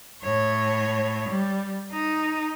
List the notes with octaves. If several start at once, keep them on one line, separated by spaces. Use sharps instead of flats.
A2 C#5
G3
D#4